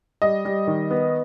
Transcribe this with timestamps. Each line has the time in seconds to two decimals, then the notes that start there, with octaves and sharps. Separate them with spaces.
0.22 G3 D#5
0.45 G3
0.67 D#3
0.91 B3